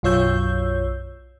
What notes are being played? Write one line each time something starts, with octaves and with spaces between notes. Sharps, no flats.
B1 F#2 F4 C#5 E6 G6